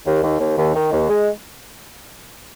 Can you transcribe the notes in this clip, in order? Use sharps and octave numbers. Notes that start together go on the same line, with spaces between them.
D#2
D#2
D#2
D#2
D#3
D#2
G#3